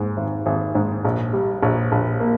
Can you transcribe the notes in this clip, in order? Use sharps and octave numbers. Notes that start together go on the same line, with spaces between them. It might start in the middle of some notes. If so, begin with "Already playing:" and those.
Already playing: G#2
G#1
G#1
G#2
A#1
G3
A#1
A#1
A#3